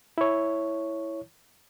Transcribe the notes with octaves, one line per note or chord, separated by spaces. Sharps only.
E4 C#5